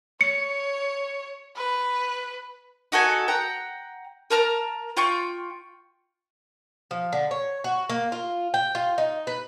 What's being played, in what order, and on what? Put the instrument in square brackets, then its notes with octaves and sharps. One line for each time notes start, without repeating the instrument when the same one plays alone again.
[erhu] C#5 [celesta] C#7
[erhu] B4
[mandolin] D#4 F#4 A4 G#5
F#5 G5 A#5
A#4 A5 A#5 F6
F4 G5 C#6
[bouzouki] F3
D3
C#5
F#4
A#3
F4
G5
F4
D#4
B4